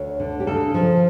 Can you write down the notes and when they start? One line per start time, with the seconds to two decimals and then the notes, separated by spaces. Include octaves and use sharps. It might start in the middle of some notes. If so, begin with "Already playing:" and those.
Already playing: D2 C#5
0.20 D3
0.40 G4
0.47 C#3 A4
0.74 F3